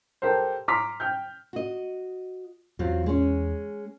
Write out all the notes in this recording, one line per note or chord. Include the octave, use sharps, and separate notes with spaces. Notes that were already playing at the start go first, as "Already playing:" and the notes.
G4 A4 A#4 C5
A#5 C6 D6 F6 B6
G5 F6 G6
F#4 D#5
E2 F#3 C4 F4
G#3 C#4